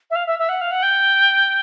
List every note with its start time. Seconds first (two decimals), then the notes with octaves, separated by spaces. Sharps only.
0.10 E5
0.15 F5
0.26 E5
0.38 E5
0.49 F#5
0.61 F5
0.71 F#5
0.82 G5